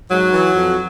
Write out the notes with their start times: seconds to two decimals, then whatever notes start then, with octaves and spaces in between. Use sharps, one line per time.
0.10 G#2 F#3
0.33 E3
0.54 F2